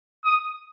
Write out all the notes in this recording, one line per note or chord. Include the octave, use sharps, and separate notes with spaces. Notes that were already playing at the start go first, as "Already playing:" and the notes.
D#6